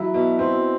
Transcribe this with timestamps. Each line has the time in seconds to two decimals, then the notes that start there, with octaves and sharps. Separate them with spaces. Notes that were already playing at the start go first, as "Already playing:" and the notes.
Already playing: F#3 E4
0.14 B2
0.39 C4